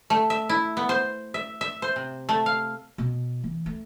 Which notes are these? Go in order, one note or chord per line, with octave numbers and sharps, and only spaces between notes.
A3
E5
E4
B3
C5
E5
E5
C5
C3
A3
F5
B2
E3
A3